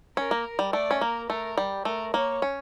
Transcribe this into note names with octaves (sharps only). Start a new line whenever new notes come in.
C#4 A#4
A#3
G3
A3 D5
C#4
A#3 A#4
A3 A#4
G3
A3 A#4
A#3 C#5
C#4